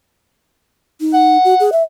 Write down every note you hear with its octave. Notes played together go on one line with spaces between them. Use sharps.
D#4
F#5
F#4
G#4
E5